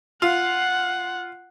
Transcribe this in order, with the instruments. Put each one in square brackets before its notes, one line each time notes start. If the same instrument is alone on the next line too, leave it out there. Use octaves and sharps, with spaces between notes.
[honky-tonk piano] F4 [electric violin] F#5